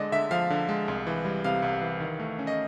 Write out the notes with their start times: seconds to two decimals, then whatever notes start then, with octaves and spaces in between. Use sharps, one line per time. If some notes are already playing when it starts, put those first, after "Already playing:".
Already playing: D3 G#3 D5 D#5
0.12 D3 E5
0.31 F3 F5
0.50 D3
0.69 G#3
0.88 C2
1.07 E3
1.25 G3
1.44 C3 F5
1.63 C2
1.81 E3
2.00 D#3
2.20 A3
2.39 C#4
2.47 D#5